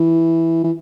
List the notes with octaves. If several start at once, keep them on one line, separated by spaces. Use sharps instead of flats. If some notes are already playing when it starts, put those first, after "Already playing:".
Already playing: E3
E3